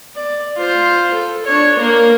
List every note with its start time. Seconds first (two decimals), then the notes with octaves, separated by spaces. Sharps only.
0.16 D5
0.57 F4 C5
1.14 A4
1.46 D4 C#5
1.79 A#3 A#4